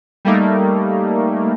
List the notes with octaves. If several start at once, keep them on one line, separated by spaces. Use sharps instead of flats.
G3 A3 A#3 D#4